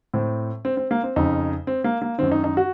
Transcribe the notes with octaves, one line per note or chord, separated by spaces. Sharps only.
A2 C4
C4
C4
A#3
C4
F2 C#3 D#4
C4
A#3
A#3
F#2 D#3 C4
D#4
D#4
F#4